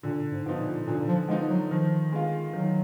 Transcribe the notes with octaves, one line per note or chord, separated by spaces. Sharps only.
A#2 D3
G#2
F3 B3 D#4
A#2
A#2 D3
F3
F3 G#3 B3 D#4
F#3
D#3 F3
G#3 B3 F4
D#3 F#3